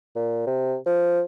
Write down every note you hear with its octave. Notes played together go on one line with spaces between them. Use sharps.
A#2
C3
F3